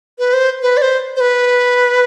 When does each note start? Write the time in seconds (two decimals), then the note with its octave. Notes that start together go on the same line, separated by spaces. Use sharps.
0.19 B4
0.33 C5
0.62 B4
0.77 D5
0.82 C5
1.16 C5
1.20 B4